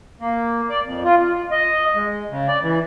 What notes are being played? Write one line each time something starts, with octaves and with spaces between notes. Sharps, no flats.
A#3
D5
F2
F4
F4
D#5
G#3
C#3
D5
E3